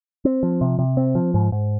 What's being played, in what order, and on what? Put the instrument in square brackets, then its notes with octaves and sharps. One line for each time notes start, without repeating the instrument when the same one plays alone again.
[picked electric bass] C4
F3
C3
C3
C4
F3
G#2
G#2